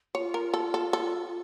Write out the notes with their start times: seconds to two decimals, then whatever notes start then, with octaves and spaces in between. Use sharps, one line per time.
0.15 F4 C#5
0.34 A#4
0.54 A4
0.74 A4
0.93 A4